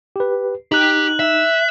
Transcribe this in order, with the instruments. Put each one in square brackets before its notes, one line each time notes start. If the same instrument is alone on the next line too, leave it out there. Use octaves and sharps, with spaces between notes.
[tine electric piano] G4 B4
[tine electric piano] D#4 [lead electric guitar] G4 [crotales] F#6 F#7
[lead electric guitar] E5